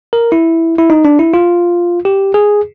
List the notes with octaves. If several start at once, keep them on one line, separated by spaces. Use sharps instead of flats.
A#4
E4
E4
D#4
D4
E4
F4
G4
G#4